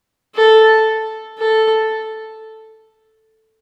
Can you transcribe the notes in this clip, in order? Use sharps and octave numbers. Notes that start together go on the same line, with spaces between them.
A4
A4